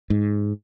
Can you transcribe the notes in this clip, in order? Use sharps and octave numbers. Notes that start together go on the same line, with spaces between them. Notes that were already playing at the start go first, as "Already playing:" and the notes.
G#2